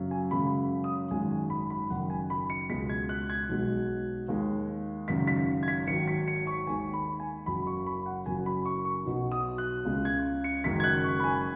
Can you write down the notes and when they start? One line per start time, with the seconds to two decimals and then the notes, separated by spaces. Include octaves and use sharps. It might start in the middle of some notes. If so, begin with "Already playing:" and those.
Already playing: F#2 C#3 F#3
0.11 G#5
0.31 F#2 C#3 G#3 B5
0.84 D#6
1.11 G#1 F#2 D#3 G#3 G#5
1.31 G#5
1.50 B5
1.70 B5
1.90 F#1 F#2 D#3 F#5
2.10 G#5
2.30 B5
2.50 C#7
2.69 C#2 B2 G#3 B6
2.89 G#6
3.09 F#6
3.30 G#6
3.49 B1 B2 G#3
4.28 D#2 D#3 G#3
5.08 G#1 F#2 C#3 B6
5.27 B6
5.63 G#6
5.68 B6
5.87 G#1 G#2 D#3 F#3 C#7
6.08 B6
6.28 C#7
6.47 C#6
6.67 D#2 D#3 G#3 G#5
6.93 B5
7.20 G#5
7.46 F#1 F#2 C#3 F#3 B5
7.67 C#6
7.87 B5
8.06 F#5
8.26 F#1 F#2 F#3 G#5
8.46 B5
8.66 C#6
8.85 C#6
9.05 B1 B2 F#3
9.32 D#6
9.58 F#6
9.85 C#2 C#3 G#3
10.05 G#6
10.44 C#7
10.64 F#1 F#2 D#3 G#3 B6
10.80 G#6
10.84 F#6
11.04 C#6
11.20 B5
11.24 G#5